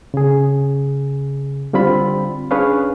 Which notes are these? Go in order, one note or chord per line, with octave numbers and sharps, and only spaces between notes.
C#3 G#4
D3 G3 C4 F4 B5
C#4 D4 G#4 B4 C#5 F5